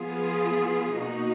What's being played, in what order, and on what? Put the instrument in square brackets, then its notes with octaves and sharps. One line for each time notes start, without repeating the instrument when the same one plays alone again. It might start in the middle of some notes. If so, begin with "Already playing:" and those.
Already playing: [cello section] F3 B3 F4 G#4
B2 A#3 D#4 F#4